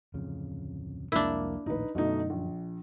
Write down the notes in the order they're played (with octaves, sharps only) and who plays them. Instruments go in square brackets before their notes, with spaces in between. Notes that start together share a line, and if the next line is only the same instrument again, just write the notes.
[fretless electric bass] D1 F2 C#3
[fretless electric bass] C2 F2 G#3 [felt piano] A#3 [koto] D4 E4
[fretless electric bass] A#1 D#2 A2 [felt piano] D#4 B4
[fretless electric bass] F#2 D3 [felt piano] B2 A3 D#4
[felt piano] A#1